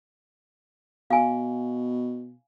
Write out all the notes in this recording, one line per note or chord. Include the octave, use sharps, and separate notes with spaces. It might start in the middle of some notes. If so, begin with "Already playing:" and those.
B2 F5 G#5